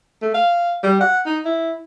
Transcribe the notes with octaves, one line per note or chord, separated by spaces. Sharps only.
A3
F5
G3
F#5
D#4
E4